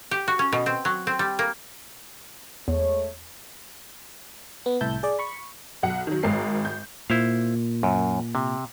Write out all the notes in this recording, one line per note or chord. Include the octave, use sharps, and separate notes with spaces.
G4
F#4
C#4
B2
C4
F#3
C4
G3
A#3
E2 G#3 A3 C#5
B3
C2 A2 E5 A5 G6
G#4 D5
B5 C#6
B1 F#5
D#3 F#3
G#1 G#2 A#4 C7
G6
A#2 E4 C5 F5
F#2
C3